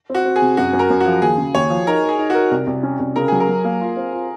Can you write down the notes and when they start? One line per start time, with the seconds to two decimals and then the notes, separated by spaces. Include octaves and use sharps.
0.10 C4 F#4
0.25 C4
0.36 G#4
0.42 C3
0.57 F#2 F#4
0.73 F#2
0.79 A#4
0.90 F#2
1.00 F#4
1.06 F3
1.22 D#2 G#4
1.38 C#3
1.55 D#2 C#5
1.70 F3
1.87 D#4 A#4
2.03 A#4
2.09 G#4
2.18 D#4
2.30 F#4
2.35 A#4
2.51 C2
2.67 C2
2.83 C#4
3.00 C2
3.16 C#3 A#4
3.28 F#3 G#4
3.40 A#4
3.49 F#3
3.65 A#3
3.81 F4
3.97 C4
4.12 F4